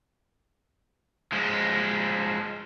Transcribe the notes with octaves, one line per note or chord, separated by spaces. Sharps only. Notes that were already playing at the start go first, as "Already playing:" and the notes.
F3 G#3